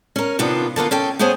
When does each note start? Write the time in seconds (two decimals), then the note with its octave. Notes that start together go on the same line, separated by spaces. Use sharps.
0.16 C#4 A#4
0.39 C3 D#3 B3 D4 F4
0.76 D3 A#3 B3 F4
0.91 C#4 A4 G5
1.19 A3 B3 G#4 C5 C#5 G#5